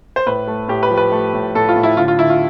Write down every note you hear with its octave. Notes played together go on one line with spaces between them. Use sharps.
C5
A2 B4
A3
A2 G4
B4
F3
B4
A3
A2
A2 A4
F4
A2
E4
D3 F4
F4
D3 E4
F4